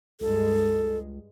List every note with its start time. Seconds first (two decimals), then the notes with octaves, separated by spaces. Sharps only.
0.21 C#2 G2 G#3 A4